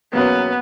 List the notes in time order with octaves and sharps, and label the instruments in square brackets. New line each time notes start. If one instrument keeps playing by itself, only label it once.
[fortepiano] E2 B2 F#3 A#3 C#4 [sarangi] B3